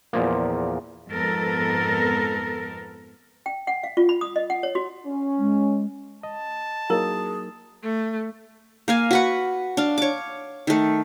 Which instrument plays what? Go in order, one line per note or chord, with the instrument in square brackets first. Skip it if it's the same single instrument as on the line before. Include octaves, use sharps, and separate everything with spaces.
[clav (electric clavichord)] E2 A#2 F3 A#3
[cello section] F2 G#2 B3 A4 A#4
[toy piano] G5
F#5
F5
F4
B5
D#6
D#5
F#5
C#5
F#4
[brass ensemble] C#4
[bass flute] G#3
[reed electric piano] D#5 [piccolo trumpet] A5
[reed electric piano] F#3 A#3 D#4 [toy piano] E4 A#4 [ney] G#4
[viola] A3
[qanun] A#3 F5 G#5
F#4 B4 F#5
D4 F5
C#5 D6
D#3 A3